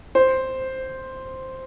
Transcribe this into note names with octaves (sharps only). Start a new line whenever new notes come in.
C5